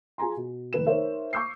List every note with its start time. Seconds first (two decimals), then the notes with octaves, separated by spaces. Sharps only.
0.18 F4 G#4 G#5 A#5 C6
0.37 B2
0.73 F1 D#3 B4 E7
0.86 D#4 A#4 C5 C#5 E5
1.33 C#6 D6 E6 G6 C7